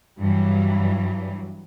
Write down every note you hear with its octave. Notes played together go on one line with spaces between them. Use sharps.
G2 E3 F#3